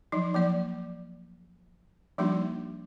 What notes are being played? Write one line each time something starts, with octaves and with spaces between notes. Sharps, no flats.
F3 F#3 D#4
F3 A#3 D5
F3 G3 A#3 D4 D#4 F#4